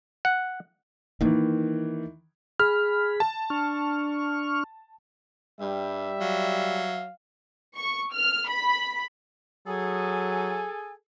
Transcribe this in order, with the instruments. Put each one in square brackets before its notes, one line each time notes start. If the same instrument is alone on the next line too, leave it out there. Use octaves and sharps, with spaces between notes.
[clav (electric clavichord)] F#5
[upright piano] D#3 E3 [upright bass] A#3 D#4
[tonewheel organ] G#4 B5 [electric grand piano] F6
[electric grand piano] A5
[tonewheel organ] D4 C#6 F6
[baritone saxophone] G2 [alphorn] G3 [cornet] E5
[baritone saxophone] F#3 [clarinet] F5
[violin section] C#6
F6
B5
[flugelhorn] F#3 [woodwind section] G#4 A4 G#5